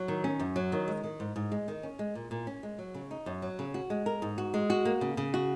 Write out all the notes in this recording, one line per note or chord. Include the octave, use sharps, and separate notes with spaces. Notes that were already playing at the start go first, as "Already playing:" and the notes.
Already playing: F#3
D#3
C#4
F#2
F#3
D#3
G#3
D#3
G#2
G#2
G#3
D#3
C#4
G#3
A#2
A#2
C#4
G#3
F#3
C#3
D#4
F#2
F#3
C#3
F#4
G#3
A#4
G#2
F#4
G#3
F#4
A#3
C#3
C#3
F#4